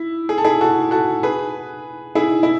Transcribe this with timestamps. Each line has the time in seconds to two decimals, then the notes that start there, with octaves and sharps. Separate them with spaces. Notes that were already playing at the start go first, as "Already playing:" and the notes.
Already playing: E4
0.29 G#4
0.38 A4
0.45 E4 G#4
0.61 F#4 A4
0.91 F#4 A4
1.23 G#4 B4
2.15 E4 G#4
2.43 E4